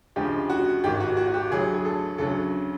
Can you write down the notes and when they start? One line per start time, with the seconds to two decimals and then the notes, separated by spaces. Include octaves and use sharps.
0.16 D2 C#3 F3 G#3 G4
0.50 F#4
0.84 G#1 G#2 D#3 G4
1.00 F#4
1.17 F#4
1.28 F#4
1.34 G4
1.51 D2 D3 F#3 G#4
1.74 G#4
1.85 A4
2.18 D2 C#3 F#3 A4